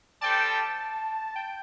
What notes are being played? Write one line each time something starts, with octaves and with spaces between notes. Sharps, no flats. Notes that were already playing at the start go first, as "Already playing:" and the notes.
G3 C4 A4 D5 G5 A5
G5